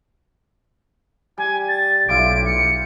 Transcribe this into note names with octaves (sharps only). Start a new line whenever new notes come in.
G3 G#5
A6
B1 E4 F4 G4 D7
C#7